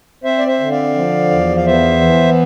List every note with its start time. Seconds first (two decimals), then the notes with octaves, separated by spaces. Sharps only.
0.24 C4 C5 E5
0.39 D5
0.48 C5 E5
0.60 D3
0.71 D5 F5
0.95 F3
1.31 E2
1.57 F5
1.66 B3 C5 E5
2.01 E3